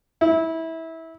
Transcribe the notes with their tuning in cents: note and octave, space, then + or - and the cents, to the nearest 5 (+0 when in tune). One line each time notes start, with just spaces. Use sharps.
E4 -20